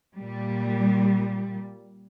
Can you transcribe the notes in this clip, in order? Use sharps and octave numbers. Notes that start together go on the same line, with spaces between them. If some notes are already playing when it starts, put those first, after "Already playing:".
A#2 G3